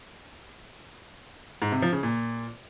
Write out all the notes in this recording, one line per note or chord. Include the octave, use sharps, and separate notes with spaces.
G#2
C3
F3
C#3
A#2